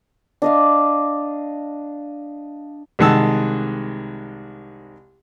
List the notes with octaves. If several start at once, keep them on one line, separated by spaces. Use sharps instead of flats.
D4 D#5 F5
C2 D#3 G#3 F#5 A5 E6